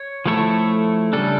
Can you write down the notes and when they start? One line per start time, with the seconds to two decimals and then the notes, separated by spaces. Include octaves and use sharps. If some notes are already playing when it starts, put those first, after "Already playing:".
Already playing: C#5
0.26 F3 A3 E4 A4 C#5
1.13 C#3 G3 D4 A4